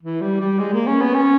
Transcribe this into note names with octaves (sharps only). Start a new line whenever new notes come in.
E3
G3
G3
G#3
A#3
C#4
B3
C#4